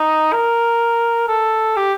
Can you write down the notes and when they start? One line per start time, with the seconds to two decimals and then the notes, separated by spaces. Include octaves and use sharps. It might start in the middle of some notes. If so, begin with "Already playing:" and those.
Already playing: D#4
0.32 A#4
1.28 A4
1.76 G4